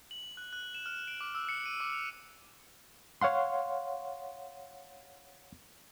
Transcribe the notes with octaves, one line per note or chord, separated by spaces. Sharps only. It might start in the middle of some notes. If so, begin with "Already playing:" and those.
F#7
F#6
F#6
E7
F6
D7
D6
E6
C#7
D#7
D6
F7
C#5 F5 F#5 C6